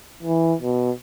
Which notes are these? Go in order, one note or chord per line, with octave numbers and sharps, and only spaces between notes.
E3
B2